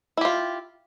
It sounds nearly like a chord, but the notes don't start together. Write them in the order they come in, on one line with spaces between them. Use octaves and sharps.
E4 G4 F4